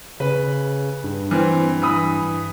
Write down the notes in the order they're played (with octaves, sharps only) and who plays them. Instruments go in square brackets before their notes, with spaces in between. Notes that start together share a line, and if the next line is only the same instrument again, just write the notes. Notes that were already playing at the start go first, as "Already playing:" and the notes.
[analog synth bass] C#3 [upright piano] B4
[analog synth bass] G2
[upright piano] E3 C4
E3 B5 D#6